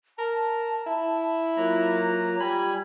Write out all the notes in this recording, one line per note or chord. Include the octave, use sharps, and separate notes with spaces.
A#4 A5
E4
F#3 A#3 F4 A#5
G3 G#5 B5